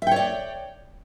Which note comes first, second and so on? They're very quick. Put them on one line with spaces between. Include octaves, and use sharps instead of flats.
E5 G5 C#5 D5